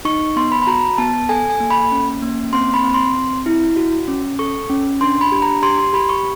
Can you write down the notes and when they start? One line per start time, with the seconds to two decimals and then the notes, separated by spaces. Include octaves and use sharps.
0.05 D#4 C#6
0.36 B3 C6
0.52 B5
0.62 B5
0.67 F#4 A#5
0.98 B3 A5
1.29 A4 G#5
1.50 G#5
1.60 A#3
1.71 B5
1.91 C#4
2.22 A#3
2.53 C4 C6
2.74 B5
2.84 C4
2.94 C6
3.15 C4
3.46 E4
3.77 F#4
4.08 C#4
4.39 A4 C#6
4.70 C#4
5.01 D4 C6
5.21 B5
5.32 G4
5.42 A#5
5.63 G4 C6
5.78 C6
5.93 G4 B5
6.09 C#6